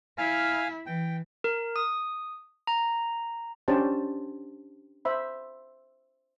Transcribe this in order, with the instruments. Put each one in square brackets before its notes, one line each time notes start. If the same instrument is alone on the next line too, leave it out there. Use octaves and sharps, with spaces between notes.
[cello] E4 [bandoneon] F5 G#5 F6
[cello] E3 [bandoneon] G5
[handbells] A#4
D#6
A#5
[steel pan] C#4 D4 G4 C5 A5
C5 E5 B5